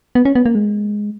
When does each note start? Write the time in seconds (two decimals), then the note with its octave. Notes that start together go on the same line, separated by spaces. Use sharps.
0.15 B3
0.25 C#4
0.35 B3
0.46 A#3
0.55 G#3